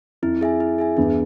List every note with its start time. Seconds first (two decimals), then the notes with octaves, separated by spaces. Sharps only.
0.22 F2 E4
0.41 G#4 E5 G#5
0.60 E4
0.78 G#4 E5 G#5
0.97 E2 G2 G#4